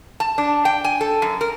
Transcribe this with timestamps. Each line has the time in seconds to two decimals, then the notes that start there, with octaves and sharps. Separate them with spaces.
0.20 A5
0.38 D4
0.65 G5
0.84 G#5
1.01 A4
1.22 F#2
1.41 A#4